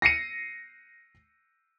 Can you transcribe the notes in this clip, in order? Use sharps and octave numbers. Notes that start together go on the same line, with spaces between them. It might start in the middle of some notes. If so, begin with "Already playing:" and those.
A#6 C7 C#7 D#7